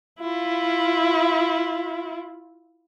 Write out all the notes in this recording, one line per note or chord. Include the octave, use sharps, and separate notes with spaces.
E4 F4